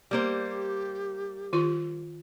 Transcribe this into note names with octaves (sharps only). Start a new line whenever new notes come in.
G3 A#3 G4 C5
D#3 F4 C6